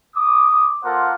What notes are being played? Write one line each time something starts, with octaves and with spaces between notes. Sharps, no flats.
D6 D#6
A#3 F4 A4 A#4 C5 F#5